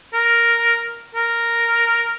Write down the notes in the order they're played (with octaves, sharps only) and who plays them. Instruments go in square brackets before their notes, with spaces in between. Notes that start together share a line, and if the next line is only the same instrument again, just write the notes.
[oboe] A#4
A#4